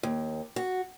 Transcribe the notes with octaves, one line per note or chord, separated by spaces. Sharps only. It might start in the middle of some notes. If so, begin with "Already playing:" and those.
D#2
F#4